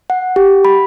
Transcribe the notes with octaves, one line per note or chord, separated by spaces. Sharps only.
F#5
G4
B5